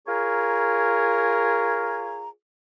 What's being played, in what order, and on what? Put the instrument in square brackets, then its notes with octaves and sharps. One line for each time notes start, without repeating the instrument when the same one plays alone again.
[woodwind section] F4 G#4 A#4 C#5 G#5 A#5